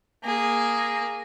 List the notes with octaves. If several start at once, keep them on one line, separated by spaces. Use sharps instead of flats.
A#3 G#4